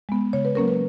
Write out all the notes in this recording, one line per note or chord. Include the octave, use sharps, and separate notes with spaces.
G#3 B3
C#3 C#5
B4
F#3 A#3 C#4 A#4
B4